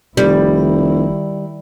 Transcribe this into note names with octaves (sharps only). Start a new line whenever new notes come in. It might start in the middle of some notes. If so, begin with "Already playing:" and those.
F1 D#3 G3 E4